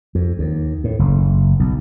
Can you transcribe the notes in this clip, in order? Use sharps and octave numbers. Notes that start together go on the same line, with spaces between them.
F2
D#2
A2
F#1
B1